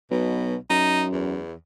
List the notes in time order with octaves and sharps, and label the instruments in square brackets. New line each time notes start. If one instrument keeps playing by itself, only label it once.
[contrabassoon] B1 [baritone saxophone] B2
[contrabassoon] F#2 [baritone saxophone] D#4
[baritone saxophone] E2